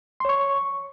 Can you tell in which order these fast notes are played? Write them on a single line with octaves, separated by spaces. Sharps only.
C6 C#5 C#6